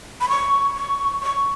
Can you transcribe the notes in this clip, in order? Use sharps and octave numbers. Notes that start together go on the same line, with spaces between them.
B5
C#6
C#6
C#6